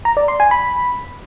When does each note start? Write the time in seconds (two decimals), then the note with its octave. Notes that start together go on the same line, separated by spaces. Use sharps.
0.05 A#5
0.17 D5
0.28 C6
0.40 G#5
0.51 B5